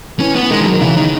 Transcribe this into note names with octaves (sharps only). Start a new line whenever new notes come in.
E3 C#4
B3
E3
D#3 G#3
E3
F#3
D#3
C#3 E3
D#3